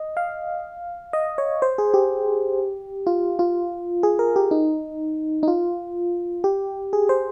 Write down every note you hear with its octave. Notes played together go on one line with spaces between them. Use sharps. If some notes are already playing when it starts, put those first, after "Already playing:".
Already playing: D#5
F5
D#5
C#5
C5
G#4
G4
F4
F4
G#4
A#4
G4
D#4
D#4
F4
G4
G#4
C5